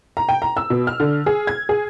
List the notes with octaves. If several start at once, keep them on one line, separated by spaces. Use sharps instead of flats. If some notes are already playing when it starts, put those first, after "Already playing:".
A#5
G5
A#5
E6
B2
F6
D3
G#4
G#6
G#4